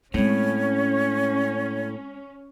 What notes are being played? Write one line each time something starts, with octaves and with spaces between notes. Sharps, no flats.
A2 G#3 C4 C#4 C#5